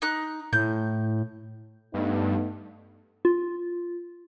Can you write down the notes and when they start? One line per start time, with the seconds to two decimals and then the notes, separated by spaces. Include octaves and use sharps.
0.02 D#4 F#6
0.53 A2 G6
1.94 G2 A3 B3 D#4
3.25 F4